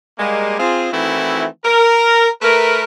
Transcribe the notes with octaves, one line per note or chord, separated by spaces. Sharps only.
G3 G#3 A#3
C4 F4 G#4
D#3 E3 A3 C4 E4 F#4
A#4
A3 A#4 B4